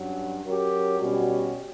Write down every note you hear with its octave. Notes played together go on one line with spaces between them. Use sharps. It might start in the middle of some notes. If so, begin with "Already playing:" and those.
Already playing: G2 F#3 C#4
F#3 C#4 G4 A#4
B2 G3 C#4 F#4